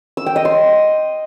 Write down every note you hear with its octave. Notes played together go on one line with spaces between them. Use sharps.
E6
G5
D#5
C6